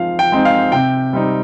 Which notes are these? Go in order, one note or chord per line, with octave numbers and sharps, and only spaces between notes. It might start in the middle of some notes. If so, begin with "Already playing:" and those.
Already playing: F3 G#3 C4 D#4 F5
G5
G#3 C4 D#4
F5
C3 G5
G3 C4 D#4